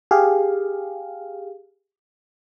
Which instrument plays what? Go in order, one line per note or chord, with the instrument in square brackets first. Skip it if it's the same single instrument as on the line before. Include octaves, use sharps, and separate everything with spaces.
[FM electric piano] G4 G#4 F5